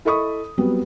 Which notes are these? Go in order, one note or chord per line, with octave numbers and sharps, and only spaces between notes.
E4 A4 D#5 B5 C#6 D#6
F#3 G3 B3 C4